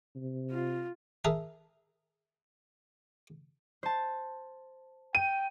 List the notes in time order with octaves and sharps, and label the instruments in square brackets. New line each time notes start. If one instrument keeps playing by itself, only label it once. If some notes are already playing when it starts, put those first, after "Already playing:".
[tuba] C3
[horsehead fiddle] F4
[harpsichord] G#4 A#4 B4 E5 A5 A#5
[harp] C5 A5
[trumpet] G5 [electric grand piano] D#7